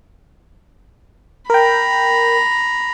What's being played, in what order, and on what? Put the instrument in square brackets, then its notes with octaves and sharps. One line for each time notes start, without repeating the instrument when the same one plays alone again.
[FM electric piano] A#4 G5 [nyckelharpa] A#5 B5